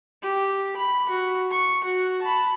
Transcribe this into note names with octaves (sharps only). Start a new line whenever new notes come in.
G4
B5
F#4
C#6
F#4
A5 B5